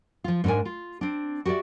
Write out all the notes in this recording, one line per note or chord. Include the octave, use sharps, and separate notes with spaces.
F3 F4
G#2 C#4 D4 A#4 G#5
F4
C4 D4
F#4 G4 B4 D5 E5